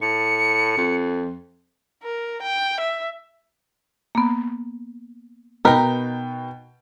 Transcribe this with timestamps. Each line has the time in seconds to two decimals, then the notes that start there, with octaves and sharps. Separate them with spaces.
0.02 A2 C#7
0.77 F2
2.03 A#4
2.42 G5
2.80 E5
4.15 A#3 B3
5.65 B2 D#4 A#4 B4 G5